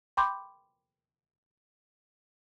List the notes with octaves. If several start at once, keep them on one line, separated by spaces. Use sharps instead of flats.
G5 B5 C6 D6 G6